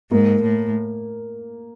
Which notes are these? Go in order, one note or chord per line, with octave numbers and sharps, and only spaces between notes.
G#2 A#3
A2